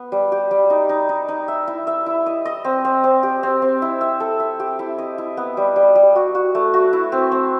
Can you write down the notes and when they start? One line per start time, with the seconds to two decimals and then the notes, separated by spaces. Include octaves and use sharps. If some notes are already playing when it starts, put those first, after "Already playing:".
Already playing: B3
0.12 G3
0.32 G4
0.51 G3
0.70 D#4
0.89 D#4
1.09 D#4
1.28 D#4
1.48 E5
1.68 E4
1.87 E5
2.06 E4
2.26 D#5
2.45 D#5
2.65 C4
2.85 C4
3.04 C4
3.23 G4
3.43 C4
3.62 C4
3.82 E4
4.01 E5
4.20 A4
4.40 E5
4.60 G4
4.79 E4
4.98 D#5
5.18 E4
5.37 B3
5.57 G3
5.76 G3
5.95 G3
6.16 F#4
6.35 F#4
6.55 A3
6.74 F#4
6.93 E4
7.12 C4
7.32 C4